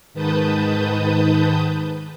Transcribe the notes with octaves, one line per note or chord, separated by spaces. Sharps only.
G#2 D#3 B4 A5 D#6 G6